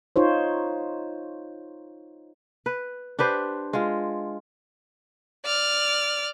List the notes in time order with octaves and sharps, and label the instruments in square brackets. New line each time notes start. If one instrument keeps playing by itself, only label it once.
[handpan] D#4 F4 C5 C#5
[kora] B4
D4 G4 B4 C5
G#3 F4
[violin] D5 F6